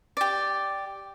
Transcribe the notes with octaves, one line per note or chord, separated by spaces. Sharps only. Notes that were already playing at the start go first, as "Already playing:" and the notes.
G4 D5